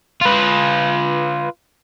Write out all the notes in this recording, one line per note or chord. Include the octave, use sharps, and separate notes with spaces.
F4 B4